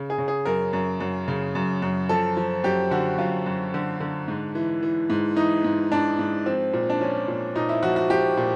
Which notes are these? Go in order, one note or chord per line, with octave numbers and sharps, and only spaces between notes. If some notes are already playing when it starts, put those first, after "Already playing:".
Already playing: C#3
G#4
C#3
G#4
F#2 A#4
F#2
F#2
C#3
F#2
F#2
F3 A4
F3
F#2 G4
D3 F#4
F#2 F4
F#2
D3
D3
G#2
E3
E3
G#2
E3 D#4
G#2
G#2 D4
G#2
F3 C4
A#2
D4
F3 C#4
A#2
A#2 D#4
E4
F3 F#4
F#4
F3 G4
A#2